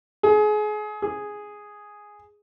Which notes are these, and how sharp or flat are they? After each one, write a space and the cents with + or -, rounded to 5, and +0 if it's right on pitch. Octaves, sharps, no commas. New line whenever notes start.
G#4 +30
G#4 +0